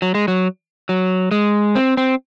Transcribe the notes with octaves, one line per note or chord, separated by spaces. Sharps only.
F#3
G#3
F#3
F#3
G#3
C4
C4